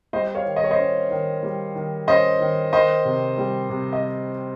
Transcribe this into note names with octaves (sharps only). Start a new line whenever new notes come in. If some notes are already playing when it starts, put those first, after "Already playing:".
G3 C5 D#5
C#5 F5
D#3
D#5
C#5
C5 D#5
C#4
D#3
G3
D#3
C#4 C5 D#5
D#3
D#3 C5 D#5
C3
G3
C3
D#5